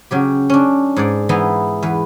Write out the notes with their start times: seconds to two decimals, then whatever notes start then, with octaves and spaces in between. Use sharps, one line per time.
0.11 C#3 F#3 G4
0.50 C#4 D4
0.96 G#2 G#4 D5
1.29 E3 G#3 B3 D#4 E4
1.83 E2 B4